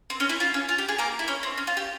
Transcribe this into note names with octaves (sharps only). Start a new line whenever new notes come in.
C4
C#4
E4
F4
C#4
F4
G4
G#4
A#3 A#4
E4
C#4
C4
C#4
F4
G4